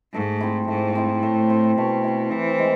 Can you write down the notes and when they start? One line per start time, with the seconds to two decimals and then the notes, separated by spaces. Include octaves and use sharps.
0.14 G#2 A3
0.41 C4 E4
0.68 G#2 A3
0.95 C4 E4
1.23 A2 A3
1.50 C4 E4
1.77 B2 A3
2.04 C4 E4
2.32 C3 E3
2.59 G#3